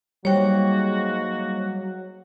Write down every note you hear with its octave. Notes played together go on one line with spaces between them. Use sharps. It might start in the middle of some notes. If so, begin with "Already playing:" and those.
G#2 F#3 G3 A#3 F#4 C#5 G5